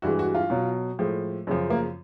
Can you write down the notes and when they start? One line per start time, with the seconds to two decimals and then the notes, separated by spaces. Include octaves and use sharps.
0.02 G2 E3 G#3 F#4
0.19 F#4
0.35 F4
0.50 B2 F#3
0.99 A2 F3 G#3
1.47 F#2 C#3 F3
1.70 A#3